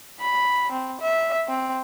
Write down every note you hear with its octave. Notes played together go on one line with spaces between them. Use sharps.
B5
C4
E5
C4